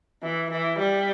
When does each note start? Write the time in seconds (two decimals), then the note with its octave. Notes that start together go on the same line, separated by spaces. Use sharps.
0.23 E3
0.51 E3
0.79 G3